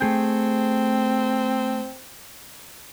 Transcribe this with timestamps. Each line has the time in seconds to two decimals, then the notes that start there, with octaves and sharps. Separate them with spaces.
0.01 A3 C4 G#4 G5